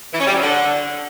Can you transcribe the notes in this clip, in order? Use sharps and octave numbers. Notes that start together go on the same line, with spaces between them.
E3
C#4
G3
F#3
D3